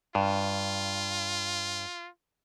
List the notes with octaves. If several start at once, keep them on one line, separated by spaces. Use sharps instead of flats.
G2 F4